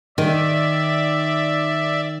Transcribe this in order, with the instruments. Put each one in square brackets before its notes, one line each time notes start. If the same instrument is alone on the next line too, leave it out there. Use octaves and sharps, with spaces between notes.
[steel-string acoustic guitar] D#3 [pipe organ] D5 E5